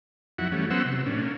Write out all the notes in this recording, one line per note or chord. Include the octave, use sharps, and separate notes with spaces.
F2 F#3 E4 F#5
E3 G3 A3 C#4
F#3 B3 C#4 C5 F#5 E6
C3
A2 C#4 D4
A#3 C#4